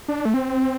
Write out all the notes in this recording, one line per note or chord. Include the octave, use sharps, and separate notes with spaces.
D4
A3
C4